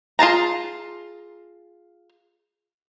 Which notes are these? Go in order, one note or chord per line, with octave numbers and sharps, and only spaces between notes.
F4 G#4 A5 A#5